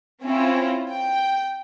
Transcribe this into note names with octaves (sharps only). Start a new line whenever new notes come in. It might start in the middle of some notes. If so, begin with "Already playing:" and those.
C4 C#4 E4 F4
G5